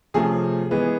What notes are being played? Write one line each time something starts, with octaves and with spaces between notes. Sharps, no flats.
C3 F3 A3 C#4 G#4
E3 G#3 B3